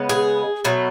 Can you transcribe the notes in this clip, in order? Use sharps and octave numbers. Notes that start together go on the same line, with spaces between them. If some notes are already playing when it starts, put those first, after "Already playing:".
Already playing: C#3 G#3 B3
G#4
B2 F#3 A3